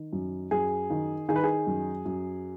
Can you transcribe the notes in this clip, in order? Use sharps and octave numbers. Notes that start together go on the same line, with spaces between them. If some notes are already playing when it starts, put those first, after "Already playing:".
Already playing: D#3
F#2
F#2 G#4
D#3
D#3 G#4
B4
G#4
F#2
F#2